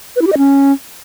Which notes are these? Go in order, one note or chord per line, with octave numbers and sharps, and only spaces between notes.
B4
E4
G4
D#5
C#4